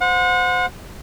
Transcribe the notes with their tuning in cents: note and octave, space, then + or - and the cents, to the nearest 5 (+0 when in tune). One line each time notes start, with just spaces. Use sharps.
C5 -20 F#5 -35